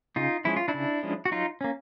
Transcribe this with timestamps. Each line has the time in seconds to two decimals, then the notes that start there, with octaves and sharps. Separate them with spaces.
0.16 C#3 D#4 F4
0.45 F3 G#3 C#4 E4
0.57 F4
0.68 D4 E4
0.74 C#3
1.03 F3 G#3 C#4
1.25 F#4
1.31 F#3 D#4 F4
1.61 A#3 C#4